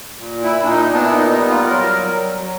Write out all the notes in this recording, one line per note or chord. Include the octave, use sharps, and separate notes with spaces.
A#2
E4
A#2
D4
D#4
B3 D4
E4
D#4
G3 D#4
F4
F#3 A#4
F#3
F#3